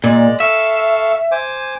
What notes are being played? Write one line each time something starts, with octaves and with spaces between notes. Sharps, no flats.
A#2 G#3 D5
A4 E5 F5 C#6
C5 G#5 D6